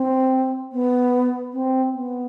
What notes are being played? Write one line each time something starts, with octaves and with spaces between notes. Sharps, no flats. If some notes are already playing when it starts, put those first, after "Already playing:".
Already playing: C4
B3
C4
B3